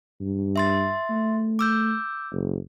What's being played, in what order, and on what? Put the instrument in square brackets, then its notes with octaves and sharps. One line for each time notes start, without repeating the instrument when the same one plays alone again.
[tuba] G2
[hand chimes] E5 C6 A6
[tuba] A3
[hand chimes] D6 E6 G6
[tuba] F#1